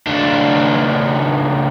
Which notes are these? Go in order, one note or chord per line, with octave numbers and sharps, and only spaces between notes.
C#2 D4